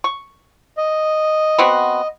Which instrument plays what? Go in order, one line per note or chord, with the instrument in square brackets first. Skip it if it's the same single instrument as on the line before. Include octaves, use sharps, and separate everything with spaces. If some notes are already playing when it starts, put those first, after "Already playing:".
[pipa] C#6
[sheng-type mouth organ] D#5
[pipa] B3 C4 F#4